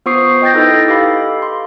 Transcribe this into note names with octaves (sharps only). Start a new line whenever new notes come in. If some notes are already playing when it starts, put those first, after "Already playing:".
B3 F4 C5 C#6 D#6 C7
D#5 G5 G6 A6 A#6
D#4 E4 A4 B4 D#5
G4 A4 F5 B5
C6